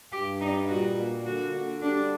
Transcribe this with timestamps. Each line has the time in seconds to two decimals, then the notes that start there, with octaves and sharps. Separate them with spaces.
0.12 G2 G4
0.41 G3 D#4
0.68 A#2 F#4
0.98 A#3
1.25 D3 F#4
1.54 D3
1.82 G3 D4